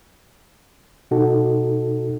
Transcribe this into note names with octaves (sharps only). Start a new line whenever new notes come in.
B2 D#4 F#4 A4